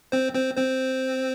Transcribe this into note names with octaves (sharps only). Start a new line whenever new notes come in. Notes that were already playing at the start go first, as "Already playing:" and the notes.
C4 C5
C4 C5
C4 C5